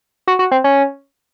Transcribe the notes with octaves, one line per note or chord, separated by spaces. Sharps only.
F#4
F#4
C4
C#4